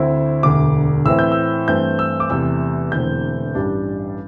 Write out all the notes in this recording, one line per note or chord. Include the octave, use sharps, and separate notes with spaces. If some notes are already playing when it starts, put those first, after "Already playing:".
Already playing: D2 D3 C4 E4
E1 D2 D3 D6
A2 E3 C4 E4 E6
G6
E6
G2 E3 A3 C4 G6
E6
D6
E2 C3 A3 E6
E1 E2 D3 A3 C4 G6
A1 G2 G3 D4